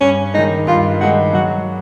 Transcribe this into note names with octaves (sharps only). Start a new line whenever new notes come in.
G2 C#4
D#3 G#3 D#4
G2 F4
D#3 G#3 F#4
F#3 F#4